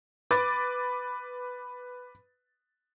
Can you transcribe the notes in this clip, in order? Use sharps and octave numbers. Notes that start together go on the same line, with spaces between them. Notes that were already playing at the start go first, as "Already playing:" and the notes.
B4 D6 A6